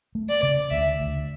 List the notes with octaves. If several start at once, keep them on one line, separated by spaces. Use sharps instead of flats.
A3
D5
C#3
D2 E5
D2